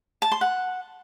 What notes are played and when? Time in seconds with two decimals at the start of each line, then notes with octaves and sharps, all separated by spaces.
0.22 A5
0.32 C6
0.41 F#5